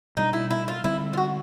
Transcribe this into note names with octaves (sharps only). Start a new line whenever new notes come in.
B2 G3 A#3 D4 D#4
E4
E4
F4
D3 G3 C4 E4
F4
F#4